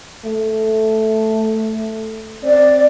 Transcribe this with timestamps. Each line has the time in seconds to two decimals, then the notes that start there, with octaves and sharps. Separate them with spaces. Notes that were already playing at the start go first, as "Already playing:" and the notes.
0.25 A3
2.43 C4 D5